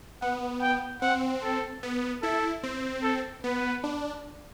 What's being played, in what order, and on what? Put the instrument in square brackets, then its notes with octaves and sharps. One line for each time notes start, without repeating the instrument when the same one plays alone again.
[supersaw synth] B3 [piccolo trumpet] F#5
[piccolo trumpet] G5
[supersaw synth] C4 [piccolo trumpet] F#5
[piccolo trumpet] A4
[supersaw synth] B3
[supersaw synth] E4 [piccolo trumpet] A4
[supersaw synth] C4
[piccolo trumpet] A4
[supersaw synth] B3 [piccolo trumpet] B4
[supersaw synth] D4